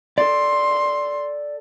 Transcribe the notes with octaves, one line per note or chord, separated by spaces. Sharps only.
A4 D5 C6